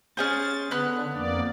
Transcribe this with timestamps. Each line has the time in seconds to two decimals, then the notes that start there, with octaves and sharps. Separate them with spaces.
0.17 C#4 G#4 C5 A6
0.71 D3 B3 F#6
1.13 F2 A#3 D5